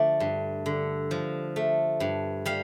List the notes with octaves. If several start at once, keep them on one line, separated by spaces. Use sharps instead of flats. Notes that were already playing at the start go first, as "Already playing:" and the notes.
Already playing: D3 F3 A3 D5
G2
D3
F3
A3
G2
G3 F5